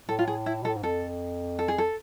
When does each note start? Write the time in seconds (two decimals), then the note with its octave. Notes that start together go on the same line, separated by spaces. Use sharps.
0.09 A2 A4
0.19 F4
0.27 G#4
0.46 E4
0.62 B2 A4
0.68 A2
0.76 G#2
0.83 F2 A4
1.59 A4
1.68 G#4
1.78 A4